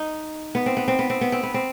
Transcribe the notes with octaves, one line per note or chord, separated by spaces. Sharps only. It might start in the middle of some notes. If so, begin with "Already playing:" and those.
Already playing: D#4
B3
C4
B3
C4
B3
C4
B3
C4
B3
C4